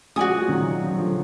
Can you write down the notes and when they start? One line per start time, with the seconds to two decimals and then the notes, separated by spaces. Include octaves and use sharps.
0.16 F3 G#3 F#4 D5 G#5 D#6
0.41 G#3
0.49 D#3 F#3
0.82 F3
0.91 F#3
0.98 D3 F3